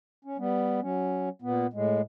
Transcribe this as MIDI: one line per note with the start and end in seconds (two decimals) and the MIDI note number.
0.25 0.37 61
0.38 0.80 55
0.38 0.80 59
0.81 1.29 54
0.81 1.29 61
1.42 1.67 46
1.42 1.67 59
1.73 2.01 45
1.73 2.01 56